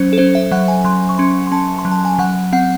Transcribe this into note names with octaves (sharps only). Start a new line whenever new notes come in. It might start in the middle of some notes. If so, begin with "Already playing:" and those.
Already playing: F#3 C#4 C5
A4
C#4 C5
E5
F#3 F#5
G#5
F#3 C6
C#6
C#4 C6
C6
C#4 A5
C6
F#3
A5
G#5
F#3 F#5
C4 F#5